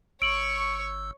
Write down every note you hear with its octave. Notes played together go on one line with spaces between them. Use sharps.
G1 C#5 C#6 E6 D7 F#7